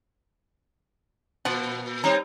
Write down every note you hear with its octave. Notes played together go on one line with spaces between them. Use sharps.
A#2 F3 F#5
G3 C4 D#4 C#5 A#5